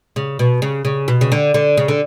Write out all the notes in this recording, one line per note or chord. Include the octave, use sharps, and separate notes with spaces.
C#3
B2
C#3
C#3
B2
C#3
D3
D3
C#3
D3